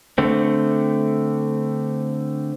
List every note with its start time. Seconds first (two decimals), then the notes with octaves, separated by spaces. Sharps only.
0.18 D3 A3 C4